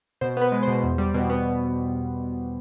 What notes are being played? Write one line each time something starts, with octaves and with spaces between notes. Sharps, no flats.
B2 C5
B3 B4
G#3
B2 C5
E2
G3
B2
B3